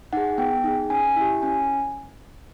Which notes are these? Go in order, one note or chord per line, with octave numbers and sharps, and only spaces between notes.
D#4 G#4 F#5
B3 G5
D#4 G#4
C#4 G#5
E4 G4
C#4 G#5